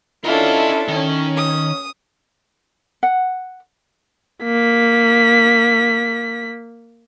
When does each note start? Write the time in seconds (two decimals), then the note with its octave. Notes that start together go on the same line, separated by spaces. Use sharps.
0.24 C#4 D4 E4 F4 A4 A#4 D#5
0.88 D#3 C#4
1.37 D#6
3.03 F#5
4.44 A#3 B6